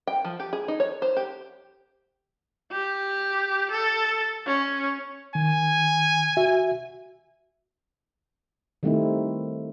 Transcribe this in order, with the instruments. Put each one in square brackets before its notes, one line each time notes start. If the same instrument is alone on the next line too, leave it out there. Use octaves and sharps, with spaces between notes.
[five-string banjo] G5
F3
G4
G#4
D#4
C#5
C5
G4
[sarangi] G4
A4
C#4
[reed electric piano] D#3 [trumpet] G#5
[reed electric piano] F#4 E5
[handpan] D#3 G3 A3 C4 D#4 E4